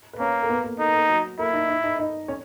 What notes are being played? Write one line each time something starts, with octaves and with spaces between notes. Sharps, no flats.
B4
A#3 C#4 C#5
A#4
B3 B4
A#3 A#4
D#4 A#4
B4
A#3 A#4
F#3 F#4
A#3 E4 A#4
D#4 D#5
D#4 D#5
D#4 D#5
D#4 D#5
C#4 C#5